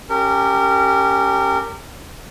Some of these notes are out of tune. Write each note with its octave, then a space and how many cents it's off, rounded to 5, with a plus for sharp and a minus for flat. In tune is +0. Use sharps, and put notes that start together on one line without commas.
C#4 +0 G4 +0 A#4 -30